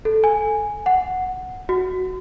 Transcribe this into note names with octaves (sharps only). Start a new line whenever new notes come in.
A4
G#5
F#5
F#4